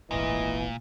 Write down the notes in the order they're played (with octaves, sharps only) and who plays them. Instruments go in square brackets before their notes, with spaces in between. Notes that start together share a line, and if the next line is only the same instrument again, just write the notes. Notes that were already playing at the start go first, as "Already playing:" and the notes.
[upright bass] D1 G#1 [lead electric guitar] A#2 [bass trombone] E3 [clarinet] D#5